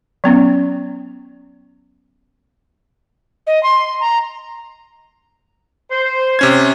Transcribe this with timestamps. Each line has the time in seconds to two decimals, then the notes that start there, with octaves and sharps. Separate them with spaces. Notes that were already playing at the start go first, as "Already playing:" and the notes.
0.24 F#3 B3 C#4
3.47 D#5
3.63 C6
4.00 A#5
5.91 C5
6.39 C3 C#4 G#6